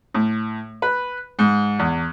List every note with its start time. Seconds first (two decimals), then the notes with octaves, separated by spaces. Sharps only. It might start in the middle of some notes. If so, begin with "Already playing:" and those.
0.14 A2
0.82 B4
1.39 G#2
1.79 E2